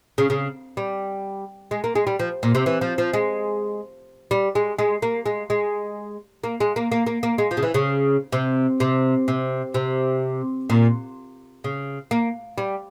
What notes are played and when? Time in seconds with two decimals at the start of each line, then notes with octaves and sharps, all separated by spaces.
0.18 C#3
0.30 C#3
0.77 G3
1.71 G#3
1.84 A#3
1.95 G#3
2.07 G3
2.19 F3
2.43 A#2
2.55 C3
2.66 E3
2.81 F3
2.98 F3
3.13 G#3
4.31 G3
4.55 G#3
4.79 G#3
5.02 A#3
5.26 G#3
5.50 G#3
6.43 A#3
6.60 G#3
6.76 A#3
6.92 A#3
7.06 A#3
7.23 A#3
7.38 G#3
7.51 F3
7.57 C#3
7.62 E3
7.74 C#3
8.32 C3
8.80 C3
9.28 C3
9.74 C3
10.70 A#2
11.64 C#3
12.11 A#3
12.58 G3